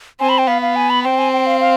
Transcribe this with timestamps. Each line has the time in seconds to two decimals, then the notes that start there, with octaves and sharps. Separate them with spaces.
0.20 C4 G#5
0.29 B5
0.38 G5
0.47 B3 F5
0.62 F5
0.76 G#5
0.90 B5
1.04 C4 G5
1.18 G#5
1.33 G5
1.46 F5
1.61 F5